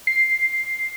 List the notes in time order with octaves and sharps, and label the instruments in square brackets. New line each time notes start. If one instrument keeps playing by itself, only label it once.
[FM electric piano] C7